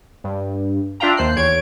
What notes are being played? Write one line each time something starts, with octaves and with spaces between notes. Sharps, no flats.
G2
D4 F4 E5 F5 G5 A#5
D#2 C5 F#6 C7
E2 C#5 G#6 D7